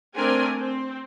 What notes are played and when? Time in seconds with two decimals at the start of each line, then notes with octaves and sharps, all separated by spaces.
0.15 A3 C4 D4 A#4 G#5
0.57 C4